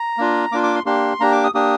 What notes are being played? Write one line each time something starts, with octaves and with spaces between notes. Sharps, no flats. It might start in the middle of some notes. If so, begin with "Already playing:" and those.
Already playing: A#5
A#3 D4 F4
A#3 D4 F4 D6
D6
C6
A#3 D4 G4 C6
A#3 D4 G4 A#5
D6
D#6
A#3 D4 G4 D#6